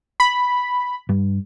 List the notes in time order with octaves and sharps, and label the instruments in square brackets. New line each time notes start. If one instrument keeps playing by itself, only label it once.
[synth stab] B5
[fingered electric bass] G2 G3